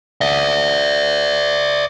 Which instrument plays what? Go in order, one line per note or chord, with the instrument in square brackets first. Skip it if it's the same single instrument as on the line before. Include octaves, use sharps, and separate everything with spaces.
[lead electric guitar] D5 E5